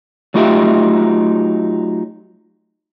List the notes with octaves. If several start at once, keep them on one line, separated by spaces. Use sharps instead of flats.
F#3 A3 D#4 F4 G4 E5